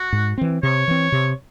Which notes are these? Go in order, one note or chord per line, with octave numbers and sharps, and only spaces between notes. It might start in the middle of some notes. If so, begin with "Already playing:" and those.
Already playing: F#4
G#2
E3 C4
C3 C#5
E3 C4
C3